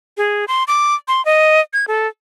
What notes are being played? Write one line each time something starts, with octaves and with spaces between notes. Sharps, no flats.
G#4
C6
D6
C6
D#5
G#6
A4